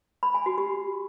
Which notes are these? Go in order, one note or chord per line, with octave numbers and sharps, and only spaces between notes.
B5
G#5
F#4
G4